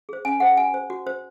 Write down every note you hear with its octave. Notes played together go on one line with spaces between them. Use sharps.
G#4 C5
C#4 G#5
G#4 C5 F#5
F#4 G#5
C5
F#4
C5